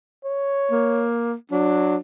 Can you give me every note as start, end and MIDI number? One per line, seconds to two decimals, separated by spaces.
0.24 1.05 73
0.71 1.34 58
1.52 1.96 54
1.52 1.97 62